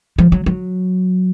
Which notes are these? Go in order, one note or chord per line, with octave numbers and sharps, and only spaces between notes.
F3
F#3
F#3